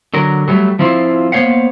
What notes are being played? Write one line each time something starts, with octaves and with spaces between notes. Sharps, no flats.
D3 F#3 A#4
F#3 G3 A3
F3 C4 E4 F4 C5
A#3 B3 C5 C#5 F5 F#5